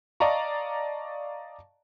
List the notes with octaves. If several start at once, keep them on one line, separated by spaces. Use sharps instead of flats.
D5 D#5 F5 A5 A#5 C#6